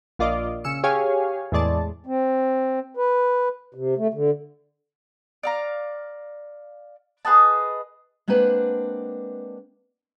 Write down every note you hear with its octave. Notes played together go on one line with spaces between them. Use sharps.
A#1 A#3 F4 D5 D#5 D6
C#3 E6 C#7
G4 G#4 C#5 F5 G#5
E2 A2 G#3 D5 A5
C4
B4
C3
A3
D3
D5 F5 A#5
G#4 B4 D#5 A5
G#3 A#3 C4 D4 B4 F#5